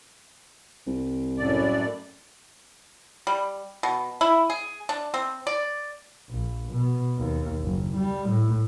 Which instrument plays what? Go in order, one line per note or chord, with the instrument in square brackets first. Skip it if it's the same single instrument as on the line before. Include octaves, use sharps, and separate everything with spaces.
[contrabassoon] C2
[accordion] F#2 A2 D5
[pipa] G3
B2
E4
G#4
D4
C4
D5
[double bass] A#1
B2
D#2
F#1
G3
A2